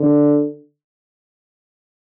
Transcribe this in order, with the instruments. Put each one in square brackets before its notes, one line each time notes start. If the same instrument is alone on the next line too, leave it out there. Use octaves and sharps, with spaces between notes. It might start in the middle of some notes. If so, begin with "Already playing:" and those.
Already playing: [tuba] D3